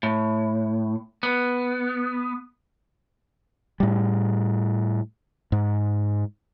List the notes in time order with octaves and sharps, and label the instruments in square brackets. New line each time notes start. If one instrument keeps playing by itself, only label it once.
[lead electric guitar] A2
B3
[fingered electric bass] A2 G3
G#2